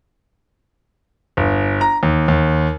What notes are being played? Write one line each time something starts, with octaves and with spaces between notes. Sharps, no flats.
G1
A#5
D#2
D#2